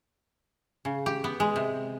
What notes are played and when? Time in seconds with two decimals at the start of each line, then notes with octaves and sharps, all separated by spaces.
0.85 C#3
1.06 G4
1.24 B3
1.40 G#3
1.56 C3